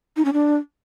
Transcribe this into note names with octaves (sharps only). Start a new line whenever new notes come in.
D#4
C#4
D4